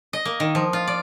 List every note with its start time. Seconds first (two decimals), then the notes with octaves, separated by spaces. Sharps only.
0.13 D#5
0.25 A#3
0.40 D#3
0.55 F3
0.73 F4
0.87 D5